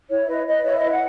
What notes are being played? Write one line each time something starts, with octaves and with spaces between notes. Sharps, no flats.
E4 C#5
B4 D#5
B4 D#5
E4 C#5
D#5
B4
F#5